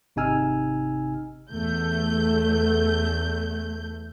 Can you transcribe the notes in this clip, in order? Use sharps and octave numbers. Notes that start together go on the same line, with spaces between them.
G#1 C3 D#4 G#5 E6 F6
E2 A3 G6